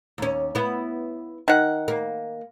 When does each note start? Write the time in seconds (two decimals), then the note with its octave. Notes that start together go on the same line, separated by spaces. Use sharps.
0.18 D#2 C#4
0.55 B3 E4
1.48 D#3 F#5
1.88 A#3